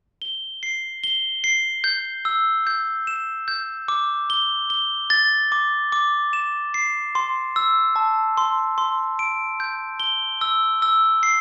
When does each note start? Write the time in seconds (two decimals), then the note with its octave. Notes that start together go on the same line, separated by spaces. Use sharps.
0.22 G7
0.63 C7
1.04 G7
1.44 C7
1.84 G6
2.25 E6
2.67 G6
3.07 E7
3.48 G6
3.88 D6
4.30 G7
4.70 G7
5.10 A6
5.52 D6
5.92 D6
6.33 E7
6.74 C7
7.15 C6
7.56 E6
7.96 A5
8.37 C6
8.78 C6
9.19 D7
9.60 G6
10.00 G7
10.41 E6
10.82 E6
11.23 C7